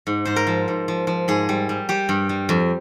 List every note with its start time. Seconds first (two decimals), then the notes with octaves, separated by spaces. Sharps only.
0.07 G#2
0.25 G#2 C5
0.36 A#4
0.47 F3
0.68 G#2
0.88 F3
1.07 F3
1.28 G#2 G#4
1.49 G3
1.69 G3
1.89 G3 G4
2.09 G2
2.29 G3
2.49 F2